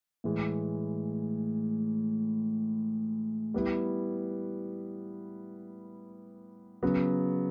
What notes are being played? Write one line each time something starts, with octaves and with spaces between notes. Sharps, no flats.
A2 E3 G#3
G3 B3 E4
C#3 F#3 B3